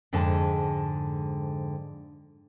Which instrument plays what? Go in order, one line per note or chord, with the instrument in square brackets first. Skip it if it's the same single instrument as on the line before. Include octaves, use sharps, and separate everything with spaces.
[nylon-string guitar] F2 G#2 D3 G#3 A4 A5